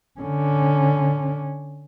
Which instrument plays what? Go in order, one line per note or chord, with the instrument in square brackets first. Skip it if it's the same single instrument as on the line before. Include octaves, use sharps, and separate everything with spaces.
[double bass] D3 C#4